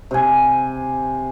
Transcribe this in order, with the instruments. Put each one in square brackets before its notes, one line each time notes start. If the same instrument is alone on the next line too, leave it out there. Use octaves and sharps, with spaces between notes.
[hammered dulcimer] C3 G#5